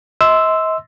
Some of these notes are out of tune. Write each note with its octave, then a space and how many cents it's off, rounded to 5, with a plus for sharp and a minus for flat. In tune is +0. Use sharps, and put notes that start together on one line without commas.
D#5 +45 C6 -5 E6 +0